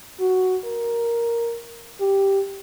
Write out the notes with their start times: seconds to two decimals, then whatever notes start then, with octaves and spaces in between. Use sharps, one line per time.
0.20 F#4
0.65 A#4
2.01 G4